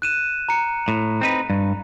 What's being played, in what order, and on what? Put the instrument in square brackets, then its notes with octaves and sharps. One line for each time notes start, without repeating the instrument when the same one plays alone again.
[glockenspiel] F#6 D#7 E7
A#5 C#7
[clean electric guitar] A2
C4 D#4 B4
G2